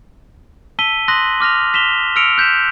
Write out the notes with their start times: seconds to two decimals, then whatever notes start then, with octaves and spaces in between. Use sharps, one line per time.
0.79 A5 E6 B6 D#7 G7
1.08 C6 D#6 F#6 A#6 F#7
1.40 D6 F6 A#6 F7
1.74 B6 E7 F7 G7
2.16 E6 F6 A#6 C#7 D7 F7
2.38 F#6 G6 B6 E7